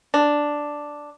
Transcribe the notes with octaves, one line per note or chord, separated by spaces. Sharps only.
D4